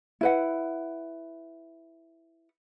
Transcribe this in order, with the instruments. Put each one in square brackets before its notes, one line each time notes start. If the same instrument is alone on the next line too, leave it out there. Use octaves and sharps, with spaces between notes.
[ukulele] E4 B4 F#5